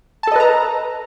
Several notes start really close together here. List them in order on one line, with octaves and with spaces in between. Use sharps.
A5 A4 D#5 B4 A#5